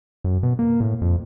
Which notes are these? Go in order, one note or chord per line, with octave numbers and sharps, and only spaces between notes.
F#2
B2
A#3
A2
F2